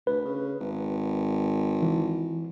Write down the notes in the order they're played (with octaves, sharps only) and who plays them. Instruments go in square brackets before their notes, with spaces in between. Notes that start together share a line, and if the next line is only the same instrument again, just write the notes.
[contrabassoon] D2 [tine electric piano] B4
[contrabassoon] C#3
G#1
[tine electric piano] E3